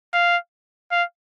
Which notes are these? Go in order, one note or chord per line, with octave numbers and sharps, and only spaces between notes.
F5
F5